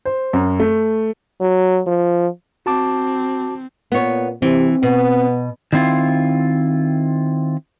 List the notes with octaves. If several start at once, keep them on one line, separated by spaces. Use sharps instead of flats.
C5
F#2
A3
F#3
F3
C4 F#4 A5 D6
A#2 B3 C#5
C3 E3 C4
B2 B3
D#3 F#3 C4 E4 F4